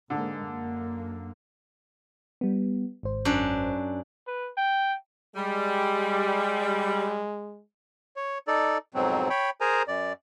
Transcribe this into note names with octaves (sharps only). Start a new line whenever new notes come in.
G#2 D3 G#3 A#3
F#2 A#3
G3 B3
G#1 G#2 C5
F#2 D4
B4
G5
G3 G#3
C#5
D#4 A4 D5
F2 G#2 B2 F#3 C4
C#5 G5 B5
G#4 A#4 C5 G#5 A#5
F#2 D5